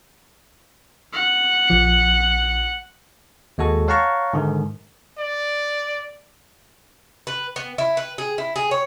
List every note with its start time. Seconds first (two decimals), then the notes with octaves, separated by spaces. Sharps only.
1.13 F#5
1.68 A#1 F3 C#7
3.58 D#2 G#3 F#4 A4
3.88 C#5 F5 F#5 A5 A#5 C#6
4.33 G#2 D3 D#3
5.18 D5
7.27 B4
7.56 B3
7.78 E4
7.97 B4
8.18 G#4
8.38 E4
8.56 G#4
8.71 C#5